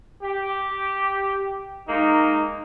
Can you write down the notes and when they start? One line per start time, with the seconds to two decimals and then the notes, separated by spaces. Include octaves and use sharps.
0.23 G4
1.88 G#3 A#3 D#4